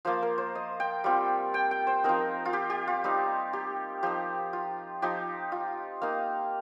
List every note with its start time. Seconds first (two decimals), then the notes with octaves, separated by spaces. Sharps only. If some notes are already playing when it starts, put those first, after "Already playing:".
0.05 F3 A#3 F4 C5
0.22 A#4
0.38 C5
0.55 D#5
0.80 G5
1.04 G3 C4 F4
1.54 G5
1.71 G5
1.87 C5
2.04 F3 C4 D#4 A#4
2.45 F4
2.53 G4
2.70 G4
2.87 F4
3.04 G3 C4 D#4
3.53 G4
4.03 F3 D#4 G4
4.53 F4
5.02 F3 D#4 G4
5.52 F4
6.02 A#3 D#4 F5